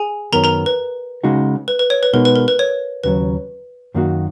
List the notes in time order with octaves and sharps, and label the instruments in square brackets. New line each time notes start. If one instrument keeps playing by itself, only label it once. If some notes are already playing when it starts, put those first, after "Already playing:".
Already playing: [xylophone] G#4 G#5
[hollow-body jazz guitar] F#2 D#3 F#3 B3 [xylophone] A#4 A#5
[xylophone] A#4 A#5
B4
[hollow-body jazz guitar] C#3 G#3 D#4 F#4
[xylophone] B4
B4
C#5
B4
[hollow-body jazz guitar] B2 G#3 D#4 F#4 [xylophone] A#4
[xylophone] B4
A#4
B4
C#5
[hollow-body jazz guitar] D#2 C#3 F#3 [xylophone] B4
[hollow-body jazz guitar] F#2 D#3 A#3 D#4 F#4